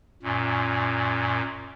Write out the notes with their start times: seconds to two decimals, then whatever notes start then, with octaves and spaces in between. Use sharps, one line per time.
0.23 F#2 A#2